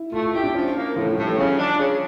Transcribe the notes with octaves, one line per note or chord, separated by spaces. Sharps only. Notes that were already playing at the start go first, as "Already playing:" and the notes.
Already playing: E4
A3 F4
F4
E4 G4
D4
F3 C#4
A#3
A2 F3
F3
A2 G3
E3
C#3 F3
D4
C#3